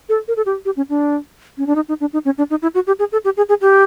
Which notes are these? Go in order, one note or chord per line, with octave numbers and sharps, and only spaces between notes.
A4
A#4
A4
G4
G4
C#4
D4
C#4
D4
D#4
D#4
D4
D#4
C#4
D4
D#4
E4
F#4
G4
G#4
A4
G4
G#4
G#4
G4